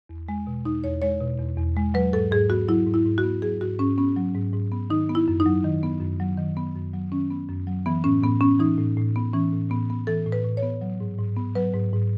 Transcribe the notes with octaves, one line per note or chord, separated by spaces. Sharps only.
E2
G#3
B2
E2 D#4
E2 C#5
G#3 C#5
B2
E2
E2
G#3
F#3 B4
G#2 A4
G#2 G#4
B3 F#4
F#3 E4
G#2
E4
G#2
F#4
B3
F#3 G#4
G#2 F#4
G#2 C#4
B3 C#4
F#3
G#2
G#2
B3
D#3 D#4
B3
E4
F#2
D#4
F#3
D#3
B3
F#2
F#3
D#3
B3
F#2
F#3
D#3 C#4
B3
F#2
F#3
E3 B3
A2 C#4
A2 B3
B3 C#4
E3 D#4
A2
A2
B3
E3 C#4
A2
A2 B3
B3
E3 A4
A2
B4
A2
C#5
B3
F#3
G#2
G#2
B3
F#3 B4
G#2
G#2